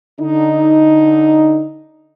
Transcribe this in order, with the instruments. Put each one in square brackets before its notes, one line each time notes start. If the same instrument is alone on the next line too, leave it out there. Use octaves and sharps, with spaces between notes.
[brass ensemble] D3 D#4